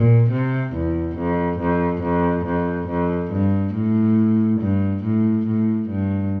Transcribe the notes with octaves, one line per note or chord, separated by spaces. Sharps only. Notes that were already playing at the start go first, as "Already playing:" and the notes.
Already playing: A#2
C3
E2
F2
F2
F2
F2
F2
G2
A2
G2
A2
A2
G2